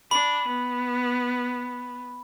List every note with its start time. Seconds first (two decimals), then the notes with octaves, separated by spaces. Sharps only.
0.11 D4 B5
0.48 B3